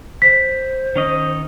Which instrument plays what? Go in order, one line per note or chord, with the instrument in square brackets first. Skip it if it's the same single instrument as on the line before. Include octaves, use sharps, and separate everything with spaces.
[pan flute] C5 [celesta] B6
[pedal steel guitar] D#3 C#4 D#5